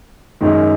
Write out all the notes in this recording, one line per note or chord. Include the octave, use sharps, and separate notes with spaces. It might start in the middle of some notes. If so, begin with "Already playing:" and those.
F#2 D#3 G#3 D#4